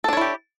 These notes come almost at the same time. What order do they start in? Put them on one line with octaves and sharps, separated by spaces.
A4 D4 C#5 E4 G4